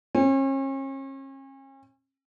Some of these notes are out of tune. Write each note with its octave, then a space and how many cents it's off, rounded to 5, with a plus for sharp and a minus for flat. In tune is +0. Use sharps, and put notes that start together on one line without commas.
C#4 -40